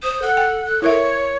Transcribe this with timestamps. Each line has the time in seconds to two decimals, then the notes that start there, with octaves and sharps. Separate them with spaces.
0.03 C5 D#6
0.22 A4 F#5
0.37 G5
0.66 F#6
0.82 E4 A#4 C#5 E5